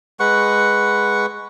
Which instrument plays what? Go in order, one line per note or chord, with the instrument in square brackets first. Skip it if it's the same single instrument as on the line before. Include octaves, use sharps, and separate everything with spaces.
[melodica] G#3 B4 F#5 C#6